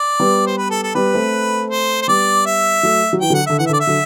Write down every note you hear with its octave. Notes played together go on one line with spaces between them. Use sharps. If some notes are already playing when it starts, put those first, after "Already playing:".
Already playing: D5
G3 B3
C5
B4
A4
A4
G3 B3 B4
A3 C4
C5
C5
G3 B3 D5
E5
F#3 A3
F#3
E3 G5
D3 F#3
F#5
D3 E5
E3 F#5
E5
D3
D5
E5
D3 F#3